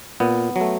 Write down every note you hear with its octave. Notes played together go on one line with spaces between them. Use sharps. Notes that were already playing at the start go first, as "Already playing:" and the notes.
A#2 B3
F#3
A3